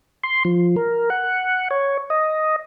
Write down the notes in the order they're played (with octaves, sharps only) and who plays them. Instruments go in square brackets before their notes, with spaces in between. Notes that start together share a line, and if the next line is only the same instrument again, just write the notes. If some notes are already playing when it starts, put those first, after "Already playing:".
[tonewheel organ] C6
F3
A#4
F#5
C#5
D#5